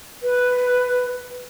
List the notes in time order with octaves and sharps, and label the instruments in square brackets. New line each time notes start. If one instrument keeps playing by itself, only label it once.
[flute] B4